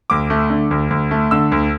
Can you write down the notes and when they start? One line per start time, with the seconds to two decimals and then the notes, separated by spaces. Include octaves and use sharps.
0.10 D2 D6
0.30 A3
0.50 D3
0.71 D2
0.90 D2
1.11 A3
1.31 D3 E6
1.52 D2